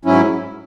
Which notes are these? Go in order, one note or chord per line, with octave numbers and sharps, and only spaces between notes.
G#2 F#3 C#4 E4